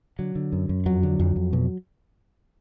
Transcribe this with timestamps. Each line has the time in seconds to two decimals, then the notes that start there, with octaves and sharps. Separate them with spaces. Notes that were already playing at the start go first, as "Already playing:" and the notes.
0.19 D3 F#3
0.35 D3
0.52 F#2
0.69 F#2
0.86 F2 F#3
1.03 D3
1.19 F2
1.36 F2
1.53 B2